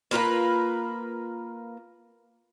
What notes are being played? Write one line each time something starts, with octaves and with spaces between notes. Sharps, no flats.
A#3 F4 A#4 B4